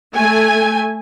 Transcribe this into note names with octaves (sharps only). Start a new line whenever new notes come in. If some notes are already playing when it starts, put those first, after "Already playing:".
A3 G#5